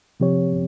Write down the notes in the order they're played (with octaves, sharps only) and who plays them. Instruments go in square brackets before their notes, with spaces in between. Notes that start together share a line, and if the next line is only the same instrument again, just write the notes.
[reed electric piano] C3 F3 C4 G4 C#5